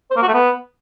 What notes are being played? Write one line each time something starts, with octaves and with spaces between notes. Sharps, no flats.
C5
A#3
F#4
A3
B3